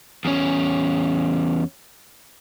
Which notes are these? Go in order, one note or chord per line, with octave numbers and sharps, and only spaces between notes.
E2 C#4